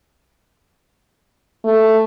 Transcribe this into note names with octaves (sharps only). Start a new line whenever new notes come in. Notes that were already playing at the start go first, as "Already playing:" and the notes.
A3